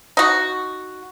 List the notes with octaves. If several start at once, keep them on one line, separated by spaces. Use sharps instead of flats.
D#4 F#4